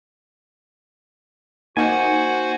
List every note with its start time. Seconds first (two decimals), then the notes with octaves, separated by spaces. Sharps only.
1.77 A#3 D#4 F#4 C5 F#5 G#5